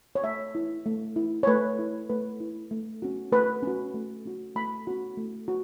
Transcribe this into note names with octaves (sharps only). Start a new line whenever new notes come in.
C#5
A3 E5
E4
A3
E4
C#5
A3 B4
E4
A3 B4
E4
A3
C#4 F#4
A3 B4
C#4 F#4
A3
C#4 F#4
A3 B5
C#4 F#4
A3
F#4